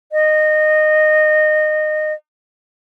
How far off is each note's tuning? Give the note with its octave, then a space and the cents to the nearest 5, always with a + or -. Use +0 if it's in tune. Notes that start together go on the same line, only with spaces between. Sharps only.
D#5 -20